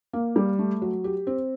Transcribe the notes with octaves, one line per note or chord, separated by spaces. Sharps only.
A#3
G3
A3
F#3
G4
C4